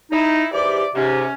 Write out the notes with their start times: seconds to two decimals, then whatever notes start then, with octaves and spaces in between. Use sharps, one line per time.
0.12 D#4 E4
0.54 G#2 E3 G4 D5
0.95 G#2 C3 C#4